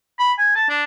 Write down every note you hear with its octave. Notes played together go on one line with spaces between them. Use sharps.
B5
G#5
A5
D4